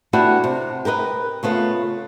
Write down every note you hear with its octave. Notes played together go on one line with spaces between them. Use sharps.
A3 B3 D4 E4 F#4 G4
C3
G4 A#4 B4 D#5
C#3 A3 B3 F4